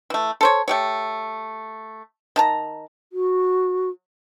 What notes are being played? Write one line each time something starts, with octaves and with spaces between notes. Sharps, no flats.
E3 A3
A4 C5 C#5
A3 G4 C#5
D#3 A5 A#5
F#4